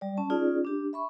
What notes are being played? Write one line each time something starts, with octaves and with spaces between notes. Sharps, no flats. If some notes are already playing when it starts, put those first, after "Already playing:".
G3 D5
C#4 A5
C#4 D#4 F4 G#4 D5
D4 G4
E5 B5 C#6